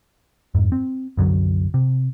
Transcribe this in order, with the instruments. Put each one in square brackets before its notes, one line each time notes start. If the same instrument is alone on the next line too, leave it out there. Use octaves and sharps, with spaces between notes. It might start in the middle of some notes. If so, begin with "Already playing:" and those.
[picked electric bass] F2 G#2
C4
C2 F#2 D3 F#3
C3